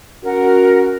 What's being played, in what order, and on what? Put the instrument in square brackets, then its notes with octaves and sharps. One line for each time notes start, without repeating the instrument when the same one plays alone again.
[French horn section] C#4 F#4 [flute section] A#4 F#5